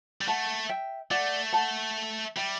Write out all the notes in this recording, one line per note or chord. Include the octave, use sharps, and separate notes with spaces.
G3
A3 F#5 A5
E5 G5
A3 D5 F#5
F#5 A5
G3 E5 G5